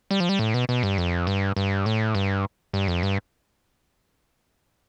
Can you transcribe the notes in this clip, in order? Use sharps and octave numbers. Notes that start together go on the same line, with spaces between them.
G3
F3
G3
A2
B2
B2
G2
F2
G2
G2
A2
G2
G2
F2
G2